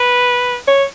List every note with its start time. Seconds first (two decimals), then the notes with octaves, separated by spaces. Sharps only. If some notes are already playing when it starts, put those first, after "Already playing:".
Already playing: B4
0.67 C#5